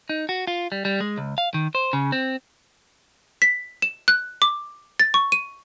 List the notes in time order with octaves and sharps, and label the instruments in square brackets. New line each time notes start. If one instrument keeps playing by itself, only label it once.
[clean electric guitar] D#4
F#4
F4
G3
G3
G#3
C#2
F5
D#3
C5
C#3
C4
[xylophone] B6
E7
F#6
D6
A6
C#6
D#7